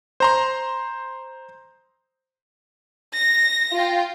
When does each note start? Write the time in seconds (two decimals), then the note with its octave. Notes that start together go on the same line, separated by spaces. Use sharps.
0.20 C5 A#5 C6
3.13 A#6
3.72 F4 G5